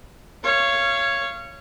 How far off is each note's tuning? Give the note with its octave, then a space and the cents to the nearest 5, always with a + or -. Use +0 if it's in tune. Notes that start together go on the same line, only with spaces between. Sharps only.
C#5 +0 F5 -30